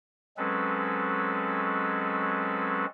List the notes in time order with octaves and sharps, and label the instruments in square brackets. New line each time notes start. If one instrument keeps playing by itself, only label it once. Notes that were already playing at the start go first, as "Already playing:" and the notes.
[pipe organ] F#3 G#3 C4 C#4 A4 B4